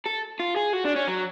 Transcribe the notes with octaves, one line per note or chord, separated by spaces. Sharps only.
A4
F4
G#4
F#4
D4
C#4
F#3